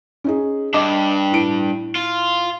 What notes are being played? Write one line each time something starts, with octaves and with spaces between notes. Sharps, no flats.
C#4 D#4 G#4
G2 D4 D#5 D6
A2 D7
F4